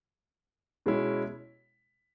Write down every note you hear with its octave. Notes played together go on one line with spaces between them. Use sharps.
B2 G#3 C#4 E4